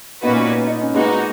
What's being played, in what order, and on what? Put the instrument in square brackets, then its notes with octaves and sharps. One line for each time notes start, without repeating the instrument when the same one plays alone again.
[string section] A#2 A#3 C#4 F#4 B4 [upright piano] B3 D#4
[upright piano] D#4
C#4
[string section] A#2 A#3 D#4 F#4 [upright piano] G#3 B3